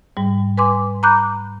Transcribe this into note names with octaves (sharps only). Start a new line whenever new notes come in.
G#2 G3
B4 G#5 C6 D6
A#5 B5 D6 F#6 G6